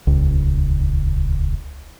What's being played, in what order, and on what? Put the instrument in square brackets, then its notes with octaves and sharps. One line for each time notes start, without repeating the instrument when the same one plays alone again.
[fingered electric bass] D#1 C#2